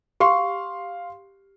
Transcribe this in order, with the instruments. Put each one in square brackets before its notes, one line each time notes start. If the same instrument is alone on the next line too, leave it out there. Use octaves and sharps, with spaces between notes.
[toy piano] G4 [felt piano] F5 C6